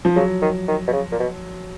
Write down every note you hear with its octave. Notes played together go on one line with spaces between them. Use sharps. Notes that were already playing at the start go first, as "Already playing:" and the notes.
F3
C#3 F#3
D#3
D#3
B2
C#3
A#2
B2